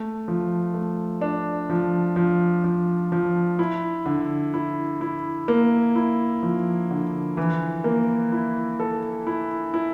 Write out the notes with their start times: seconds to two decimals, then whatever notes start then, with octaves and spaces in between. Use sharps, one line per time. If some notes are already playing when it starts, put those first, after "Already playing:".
Already playing: A3
0.28 F3
0.74 A3
1.21 D4
1.70 F3
2.16 F3
2.64 F3
3.12 F3
3.59 E4
4.06 D3
4.54 E4
5.01 E4
5.48 A#3
5.96 E4
6.43 F3
6.91 D3
7.37 E3
7.84 A#3
8.32 E4
8.80 A4
9.27 E4
9.74 E4